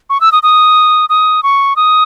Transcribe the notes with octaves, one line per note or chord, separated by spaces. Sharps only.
C#6
E6
D#6
D#6
D#6
C#6
D#6